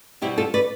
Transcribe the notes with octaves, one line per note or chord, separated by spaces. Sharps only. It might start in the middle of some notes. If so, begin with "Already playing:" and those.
B2 G3 C4 E4 G4
F4 A4
B4 D5